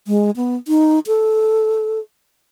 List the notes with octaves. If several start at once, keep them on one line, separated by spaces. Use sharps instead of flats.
G#3
B3
D#4
A4